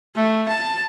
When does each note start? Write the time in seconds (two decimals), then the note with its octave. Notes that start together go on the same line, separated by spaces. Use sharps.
0.16 A3
0.48 A5